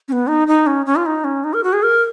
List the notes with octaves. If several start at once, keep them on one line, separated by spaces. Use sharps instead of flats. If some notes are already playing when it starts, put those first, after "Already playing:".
C#4
B3
D#4
D#4
C#4
C#4
F4
D#4
C#4
D#4
A#4
F#4
G#4
A#4